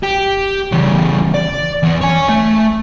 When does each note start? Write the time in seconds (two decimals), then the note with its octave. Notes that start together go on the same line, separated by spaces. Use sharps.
0.03 G4
0.72 E2 C#3
1.35 D5
1.83 E2
2.01 C#5 G#5
2.29 A3